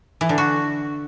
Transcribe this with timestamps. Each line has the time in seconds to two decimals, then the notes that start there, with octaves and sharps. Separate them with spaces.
0.21 E3
0.29 D3
0.38 F#4